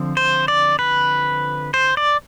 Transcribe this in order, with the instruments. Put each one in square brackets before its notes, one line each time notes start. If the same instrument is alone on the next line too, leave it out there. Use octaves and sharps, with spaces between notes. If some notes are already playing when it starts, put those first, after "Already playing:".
Already playing: [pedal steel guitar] D3 F3 C4
C5
D5
B4
C5
D5